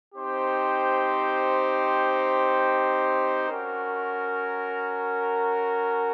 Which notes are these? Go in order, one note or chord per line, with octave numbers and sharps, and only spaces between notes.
C4 D#4 G4 C5
C#4 F#4 A#4